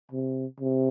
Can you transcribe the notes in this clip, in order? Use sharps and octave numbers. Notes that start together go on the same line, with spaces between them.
C3
C3